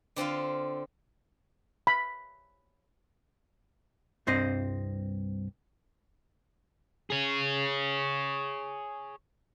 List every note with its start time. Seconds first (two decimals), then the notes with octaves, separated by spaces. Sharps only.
0.16 D3 C4 F4 F5
1.87 B5
4.27 C2 G2 C4 C5 D#5
7.10 G#4 C#5